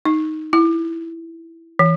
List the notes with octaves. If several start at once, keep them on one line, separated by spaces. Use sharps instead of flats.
D#4
E4
E3